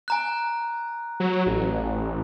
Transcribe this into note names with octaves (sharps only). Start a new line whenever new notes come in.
G#5 A#5 F#6
F#3
A1